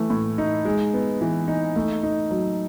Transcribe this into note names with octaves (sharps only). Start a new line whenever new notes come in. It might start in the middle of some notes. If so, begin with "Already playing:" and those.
Already playing: E3 A3
A2
D#4
G#3
B3
E3
D#4
A3
D#4
F#3